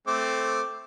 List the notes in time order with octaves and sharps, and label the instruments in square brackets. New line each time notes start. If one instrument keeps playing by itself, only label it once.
[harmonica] A3 C4 D6